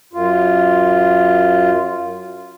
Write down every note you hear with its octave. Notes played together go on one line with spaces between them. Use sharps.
F#2 F4